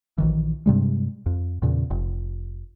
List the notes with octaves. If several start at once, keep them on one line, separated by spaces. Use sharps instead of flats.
A#1 D#3 E3
G2 C3 G3 G#3
F2
E2 A#2 C#3
F1